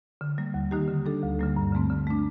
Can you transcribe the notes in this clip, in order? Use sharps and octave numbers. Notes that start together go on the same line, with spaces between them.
D3
G3 A#3
D#2
D#3 A#3 D#4 G4
D3
G3 D4 A4
D2
D3 G3 A#3
G2
D3 A3 C4
D3
A3 D4